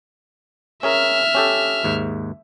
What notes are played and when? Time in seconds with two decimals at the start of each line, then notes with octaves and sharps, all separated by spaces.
0.83 C#4 G#4 A#4 E5 F6
1.35 C#4 G4 A4
1.84 D#2 G#2